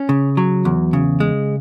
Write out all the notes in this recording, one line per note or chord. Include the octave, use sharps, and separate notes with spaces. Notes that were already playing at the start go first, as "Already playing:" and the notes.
Already playing: C#4
C#3
F#3
E2
C#3
G#3